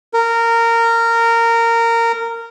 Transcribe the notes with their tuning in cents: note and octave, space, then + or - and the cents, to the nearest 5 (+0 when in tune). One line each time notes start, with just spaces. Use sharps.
A#4 -15